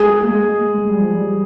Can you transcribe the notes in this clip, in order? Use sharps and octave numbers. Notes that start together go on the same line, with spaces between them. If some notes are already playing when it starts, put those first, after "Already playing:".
Already playing: G#3 G#4
A#3
G#3
G#3
G3
F3
G3